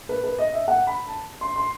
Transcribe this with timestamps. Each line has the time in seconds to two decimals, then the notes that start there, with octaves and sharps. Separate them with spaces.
0.09 B4
0.24 B4
0.38 D#5
0.53 E5
0.68 F#5
0.87 B5
1.07 A5
1.41 C6
1.56 C6